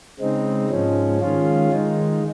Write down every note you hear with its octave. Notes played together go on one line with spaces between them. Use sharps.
C#3 G#3 C4 D#4
G#2 F3 G#3 C#4
D#3 G#3 C#4 F4
D#3 G#3 D#4